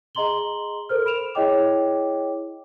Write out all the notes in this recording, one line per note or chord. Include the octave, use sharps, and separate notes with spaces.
G#4 D#5 A#5 C6 F#7 G7
A4 A#4 C5 F6
B5 D7 E7 F7
E4 G#4 C#5 D#5 G5 D6